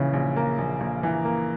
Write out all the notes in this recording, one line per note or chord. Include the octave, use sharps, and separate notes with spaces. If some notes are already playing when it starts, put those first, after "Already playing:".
Already playing: A#1 C#3 E3
A#1
A#3
A#1
A#1
E3
A#3